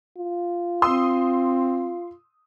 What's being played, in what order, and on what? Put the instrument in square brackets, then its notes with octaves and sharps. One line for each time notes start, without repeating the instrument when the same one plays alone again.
[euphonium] F4
[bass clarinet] C4 [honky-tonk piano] C6 D#6 E6